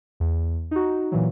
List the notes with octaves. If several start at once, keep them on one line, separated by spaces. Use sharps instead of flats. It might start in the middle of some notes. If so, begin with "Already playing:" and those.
E2
D#4 F#4
A#2 E3 F#3